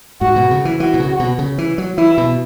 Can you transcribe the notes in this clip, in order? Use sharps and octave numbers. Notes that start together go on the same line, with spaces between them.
G#2 F#4
B2
C#3
E3
E3 F#4
B2
C#3
B2
C#3
E3
F#3
E3 E4
B2